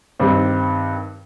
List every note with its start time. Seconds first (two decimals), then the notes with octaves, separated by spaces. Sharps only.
0.19 G2 D#3 G3 C4